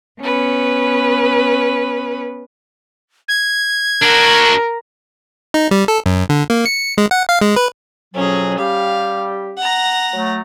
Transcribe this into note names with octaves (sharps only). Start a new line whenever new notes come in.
B3 C#4 B4
G#6
D4 F#4 A#4
D#4
G3
A4
F#2
D3
A#3
C#7
G#3
F#5
F5
G#3
B4
F2 B2 F#3 C#4 G#4
G3 G4 F5
F#5 A#5
F#3 A3